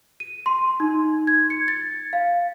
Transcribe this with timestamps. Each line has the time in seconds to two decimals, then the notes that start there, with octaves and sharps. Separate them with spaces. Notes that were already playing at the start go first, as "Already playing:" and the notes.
0.20 D#7
0.46 C6
0.80 D#4
1.27 G#6
1.50 C#7
1.68 A6
2.13 F5